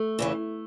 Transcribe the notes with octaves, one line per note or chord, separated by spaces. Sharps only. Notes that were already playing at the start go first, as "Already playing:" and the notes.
Already playing: A3
E2 C#3 E3